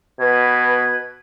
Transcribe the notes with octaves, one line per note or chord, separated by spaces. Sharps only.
B2 B4 G#6